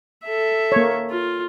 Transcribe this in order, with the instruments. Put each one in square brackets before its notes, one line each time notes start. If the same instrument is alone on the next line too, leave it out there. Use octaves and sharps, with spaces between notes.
[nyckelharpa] A4 E5
[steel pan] A#3 C#5
[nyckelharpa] F4